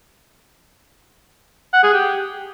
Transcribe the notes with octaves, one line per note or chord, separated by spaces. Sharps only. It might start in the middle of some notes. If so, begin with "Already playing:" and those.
F#5
G#4
G4